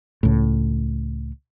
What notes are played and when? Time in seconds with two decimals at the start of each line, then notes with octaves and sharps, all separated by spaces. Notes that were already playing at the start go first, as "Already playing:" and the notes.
0.23 C#2 A2